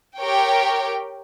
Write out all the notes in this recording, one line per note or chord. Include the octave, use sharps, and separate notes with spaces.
G4 A#4 C#5 G5